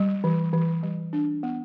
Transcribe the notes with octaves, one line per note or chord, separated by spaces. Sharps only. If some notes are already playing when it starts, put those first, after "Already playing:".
Already playing: G3
E3
E3
G3
D4
B3